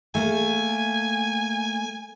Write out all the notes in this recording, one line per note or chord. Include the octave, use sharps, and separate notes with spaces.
A3 A#3 G#5